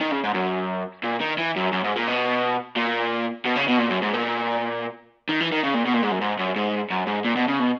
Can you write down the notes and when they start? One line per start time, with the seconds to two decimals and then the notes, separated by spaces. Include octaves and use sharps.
0.01 D#3
0.12 C#3
0.24 G#2
0.34 F#2
1.03 A#2
1.21 D#3
1.38 E3
1.56 F#2
1.73 F#2
1.84 G#2
1.96 A#2
2.08 B2
2.76 A#2
3.46 B2
3.56 C#3
3.68 B2
3.79 A#2
3.90 F#2
4.03 G#2
4.13 A#2
5.29 D#3
5.40 E3
5.52 D#3
5.64 C#3
5.75 A#2
5.86 B2
5.94 A#2
6.03 G#2
6.12 F#2
6.21 G#2
6.39 F#2
6.56 G#2
6.90 F#2
7.07 G#2
7.25 A#2
7.36 B2
7.48 C#3
7.59 B2